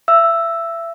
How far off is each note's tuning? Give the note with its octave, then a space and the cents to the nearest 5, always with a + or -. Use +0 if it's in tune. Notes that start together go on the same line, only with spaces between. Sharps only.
E5 +30 E6 +5